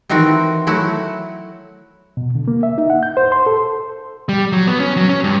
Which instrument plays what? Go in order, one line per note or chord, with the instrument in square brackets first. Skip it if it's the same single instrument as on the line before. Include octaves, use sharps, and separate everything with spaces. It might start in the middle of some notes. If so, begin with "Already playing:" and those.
[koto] D#3 E3 C4 F#4 A#4
F#3 A3 E4 F#4
[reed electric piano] B2
D3
A#3
E5
D#4
F#5
G6
C5
C6
A4
[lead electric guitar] G3
F#3
B3
C#4
F#3
C#4
G2